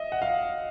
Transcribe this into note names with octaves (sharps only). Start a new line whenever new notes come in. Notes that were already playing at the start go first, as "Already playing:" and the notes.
Already playing: D#5 E5
F#5
F5